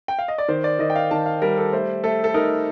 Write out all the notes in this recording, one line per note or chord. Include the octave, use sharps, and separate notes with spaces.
G5
F5
D#5
D5
D#3 C5
D5
D#3 D#5
G5
F5
D#3 A5
F5
G3 A#4
A4
A3 C5
A3 A4
A4
D#4 A#4